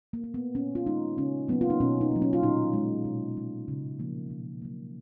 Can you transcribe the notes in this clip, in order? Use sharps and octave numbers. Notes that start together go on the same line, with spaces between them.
A#3
A#3
B3
A#2 C#4
F4
G#3 D#4
C#3 C#4
F#3 A#3 B3
F4
D#4
B2 C#4
D#4
F#3 A#3
C#4
F4
A#2 D#4
G#3
B2
G#3
C#3
F3 A#3
B2
F#3 A#3